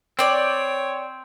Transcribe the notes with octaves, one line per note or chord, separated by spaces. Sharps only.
C4 C#5 D5 G5